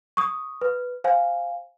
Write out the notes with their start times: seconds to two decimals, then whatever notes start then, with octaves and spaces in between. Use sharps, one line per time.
0.17 C#6 D#6
0.61 B4
1.04 C5 F5 G#5